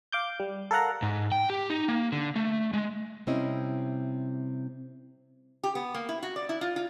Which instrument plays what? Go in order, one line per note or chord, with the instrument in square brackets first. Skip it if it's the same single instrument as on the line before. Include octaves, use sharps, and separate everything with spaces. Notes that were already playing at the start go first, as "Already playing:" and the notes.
[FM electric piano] F5 D6 G6
G3
A4 A#4 F5 F#5 A#5
[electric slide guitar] G#2
G5
G4
D#4
A#3
D3
A3
G#3
[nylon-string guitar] C3 G3 C4 C#4 E4 D#5
[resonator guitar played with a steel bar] G4
B3
A#3
E4
F#4
D5
E4
F4
F4